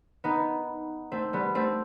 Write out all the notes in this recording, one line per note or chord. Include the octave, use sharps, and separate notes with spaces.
B3 D#4
A3 C4
G3 B3
A3 C4